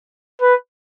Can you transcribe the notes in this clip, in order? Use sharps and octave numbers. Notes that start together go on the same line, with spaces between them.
B4